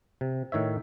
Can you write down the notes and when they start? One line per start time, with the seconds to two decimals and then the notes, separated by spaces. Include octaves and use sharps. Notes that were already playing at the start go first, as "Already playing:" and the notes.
0.21 C3
0.52 A2 D#3 C#5 E5